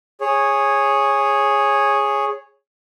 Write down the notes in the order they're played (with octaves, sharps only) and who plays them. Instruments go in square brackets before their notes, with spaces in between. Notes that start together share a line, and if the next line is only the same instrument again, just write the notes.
[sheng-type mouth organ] G#4 C#5